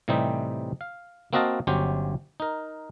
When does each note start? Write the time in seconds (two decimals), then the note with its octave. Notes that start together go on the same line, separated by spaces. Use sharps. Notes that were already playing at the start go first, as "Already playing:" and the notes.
0.08 A2 C3 E3 G3 C4 D#4
0.81 F5
1.33 A#3 C4 F#4 D#5 F5 A5
1.67 G1 F#3 C#4 G4 C5
2.40 D#4 A#4